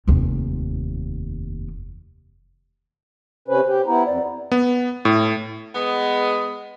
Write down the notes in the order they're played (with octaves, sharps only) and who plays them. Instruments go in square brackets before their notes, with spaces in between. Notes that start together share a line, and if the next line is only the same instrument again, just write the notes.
[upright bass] F1 D#2
[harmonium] C3 C#4 B4 [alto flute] C5
[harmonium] G4
[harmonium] B3 E4 [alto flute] A#5
[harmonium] F2 [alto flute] D5
[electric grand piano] B3
A2
[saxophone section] G#3 B3